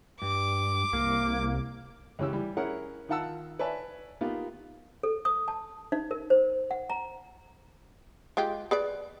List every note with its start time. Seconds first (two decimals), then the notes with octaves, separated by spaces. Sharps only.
0.22 G2 D6
0.93 C2 A#3
2.19 C#2 E3 C#4 G4 E6
2.33 E3 G3
2.57 C#4 E4 G#4 A#4 F#5
3.09 D#3 D#4 F4 F#5 A5 E6
3.59 B4 C#5 D5 E5 G#5 A5
4.21 A#3 B3 D#4 F4 G4
5.03 A4
5.25 D#6
5.48 A5
5.92 D#4
6.11 A#4
6.30 C5
6.71 F#5
6.90 A#5
8.37 G#3 F4 G4
8.71 G#4 B4 D5